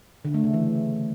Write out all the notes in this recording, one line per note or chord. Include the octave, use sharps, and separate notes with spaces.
D3
A3
C#3
E3